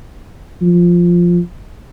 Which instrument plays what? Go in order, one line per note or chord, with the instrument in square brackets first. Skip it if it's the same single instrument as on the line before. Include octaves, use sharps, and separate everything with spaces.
[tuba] F3